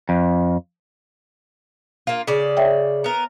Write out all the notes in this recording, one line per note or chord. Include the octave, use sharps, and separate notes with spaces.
F2
A#3 F4
C#3 D5
C#5 E5 G5
B3 A#4